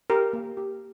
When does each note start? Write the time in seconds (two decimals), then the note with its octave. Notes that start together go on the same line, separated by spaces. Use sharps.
0.10 G4 A#4
0.33 A#3
0.57 G4